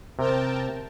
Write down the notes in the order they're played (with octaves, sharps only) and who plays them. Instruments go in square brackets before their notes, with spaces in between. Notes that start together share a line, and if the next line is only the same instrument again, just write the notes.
[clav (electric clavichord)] C3 [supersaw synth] A#4 G5 A5